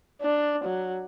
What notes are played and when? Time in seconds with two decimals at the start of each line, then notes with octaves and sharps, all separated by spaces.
0.22 D4
0.64 F#3